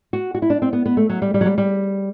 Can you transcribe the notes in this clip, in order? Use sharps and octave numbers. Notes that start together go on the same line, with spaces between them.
F#4
F#4
E4
D4
C4
B3
B3
A3
F#3
G3
G3
F#3
G3
G3